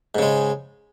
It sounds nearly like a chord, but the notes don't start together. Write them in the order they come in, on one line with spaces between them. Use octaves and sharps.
G#2 C#3 G#3